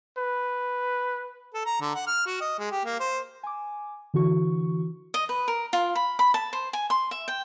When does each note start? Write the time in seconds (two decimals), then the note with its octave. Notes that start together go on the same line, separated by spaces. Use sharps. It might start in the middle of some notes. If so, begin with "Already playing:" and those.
0.18 B4
1.54 A4
1.65 A#5
1.81 D3
1.95 F#5
2.07 F6
2.26 F#4
2.41 D#5
2.59 G#3
2.71 G4
2.85 A#3
3.00 C5
3.43 G#5 D6
4.14 D3 E3 F#4 C#6
5.14 D#5
5.29 B4
5.48 A#4
5.73 F4
5.95 B5
6.19 B5
6.34 A5
6.53 C5
6.73 G#5
6.90 C6
7.11 E5
7.28 G5